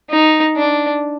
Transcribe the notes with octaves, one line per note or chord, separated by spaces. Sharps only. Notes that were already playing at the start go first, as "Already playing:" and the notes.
D#4
D4